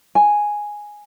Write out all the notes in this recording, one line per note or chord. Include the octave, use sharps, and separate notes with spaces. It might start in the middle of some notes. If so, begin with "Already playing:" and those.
G#5